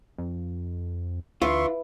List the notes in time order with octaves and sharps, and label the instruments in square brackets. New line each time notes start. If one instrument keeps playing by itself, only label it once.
[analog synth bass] F2
[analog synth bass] D2 [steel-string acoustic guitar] E3 [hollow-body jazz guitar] F4 [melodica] E5 C6 C#6